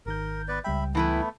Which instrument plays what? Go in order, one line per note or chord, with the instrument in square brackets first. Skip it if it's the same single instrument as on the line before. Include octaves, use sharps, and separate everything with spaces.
[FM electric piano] G#1 D#3 G6 [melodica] A#4
[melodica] B3 B4 D5
[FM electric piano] C#2 G3 G5 [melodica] E5 B5
[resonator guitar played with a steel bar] E3 E4 B4 [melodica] A3 B3